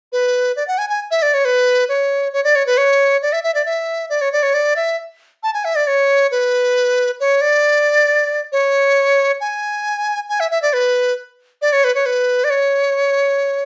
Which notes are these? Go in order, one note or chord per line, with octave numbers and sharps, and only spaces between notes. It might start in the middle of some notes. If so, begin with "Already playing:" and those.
B4
D5
F#5
G#5
G#5
E5
D5
C#5
B4
C#5
C#5
D5
C#5
B4
C#5
D5
E5
E5
D5
E5
D5
C#5
D5
C#5
D5
E5
A5
G#5
E5
D5
C#5
B4
C#5
D5
C#5
G#5
G#5
E5
E5
D5
B4
D5
C#5
B4
C#5
B4
D5
C#5